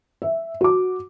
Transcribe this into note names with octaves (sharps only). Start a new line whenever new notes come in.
E5
F#4 D6